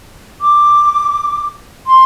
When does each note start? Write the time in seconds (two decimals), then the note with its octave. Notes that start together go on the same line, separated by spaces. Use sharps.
0.41 D6
1.87 C6